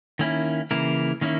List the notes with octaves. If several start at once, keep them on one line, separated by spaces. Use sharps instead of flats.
D#3 A#3 C#4 E4
C#3 E3 A#3 E4 A#4
D#3 A#3 C#4 E4